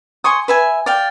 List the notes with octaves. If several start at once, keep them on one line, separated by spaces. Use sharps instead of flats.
G#5 C6 C#6 D#6
B4 E5 G#5
D5 F5 G5